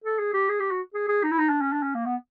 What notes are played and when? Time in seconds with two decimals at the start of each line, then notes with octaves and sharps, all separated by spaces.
0.04 A4
0.18 G#4
0.34 G4
0.49 G#4
0.60 G4
0.71 F#4
0.94 G#4
1.08 G#4
1.23 D#4
1.31 E4
1.39 D#4
1.49 D4
1.61 C#4
1.72 D4
1.82 C#4
1.94 A#3
2.05 B3